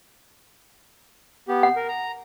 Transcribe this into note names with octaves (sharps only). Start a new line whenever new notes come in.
B3 G4
F#5
A#4
A#5